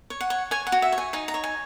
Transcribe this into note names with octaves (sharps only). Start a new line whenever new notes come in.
C#5
F#5
C#5
C#5 G#5
F#5
F#4
E5
C#5
G#5
D#4 G#5
A#5
C#5
G#5